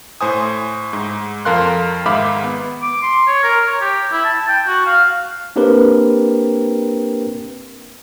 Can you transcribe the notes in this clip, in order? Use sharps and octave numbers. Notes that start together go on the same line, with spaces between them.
A2 C5 G#5 D#6
G#2
F2 A4 A#4 F5 C6 F#6
G#2 D#3 E5 F5 B5 D6
B3
D6
C6
C#5
A#4
C#5
G4
E4
A5
G5
F#4
F5
A#3 C4 D4 G4 A#4 B4